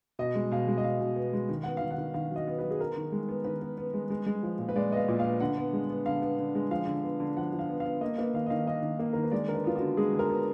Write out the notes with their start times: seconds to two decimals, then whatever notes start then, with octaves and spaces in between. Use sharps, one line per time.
0.19 B2 D#5
0.35 G#3
0.51 B2 F5
0.68 G#3
0.78 D#5
0.84 B2 F5
1.00 B2
1.16 B3
1.33 G#3
1.49 D#3
1.63 B3 F#5
1.77 D#3 F5
1.91 F#5
1.98 D#3
2.14 D#3 F5
2.31 F#3 D#5
2.47 B3
2.59 F#3 B4
2.71 G#4
2.80 B3 A#4
2.96 D#3
3.12 G#3
3.29 B3
3.44 D#3 B4
3.62 B3
3.78 B3
3.94 G#3
4.10 G#3
4.26 G#3
4.43 F3
4.59 A#2
4.69 B4
4.76 G#3 D5
4.91 B3 D#5
4.97 F5
5.08 A#2
5.19 B3 F5
5.40 D3 F#5
5.58 B3
5.73 G#3
5.90 B3
6.06 D3 F5
6.22 B3
6.39 D3
6.55 G#3
6.71 F3 F5
6.87 D3
7.03 B3
7.20 D3
7.37 F3 F#5
7.53 F3
7.59 F5
7.70 B3
7.80 F5
7.85 B3
8.01 A#3 D#5
8.18 A#3 B4
8.34 D#3 F5
8.46 D#5
8.50 D#3 F5
8.67 A#3 D#5
8.83 D#3
8.99 A#3
9.13 D#3 A#4
9.23 B4
9.32 G#3 D5
9.48 D3 A#4
9.54 B4
9.64 B3 F4
9.76 D3 F#4
9.97 G#3 G#4
10.13 D3
10.19 A#4
10.30 B3